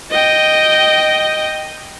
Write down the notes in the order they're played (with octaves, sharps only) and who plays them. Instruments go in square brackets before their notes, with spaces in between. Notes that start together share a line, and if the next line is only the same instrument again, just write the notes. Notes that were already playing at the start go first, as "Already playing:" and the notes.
[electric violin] D#5 G5